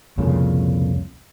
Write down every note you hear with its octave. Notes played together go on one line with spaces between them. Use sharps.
C2 F2 A#2 C#3